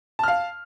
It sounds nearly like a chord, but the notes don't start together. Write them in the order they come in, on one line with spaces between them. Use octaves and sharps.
A5 F6 F5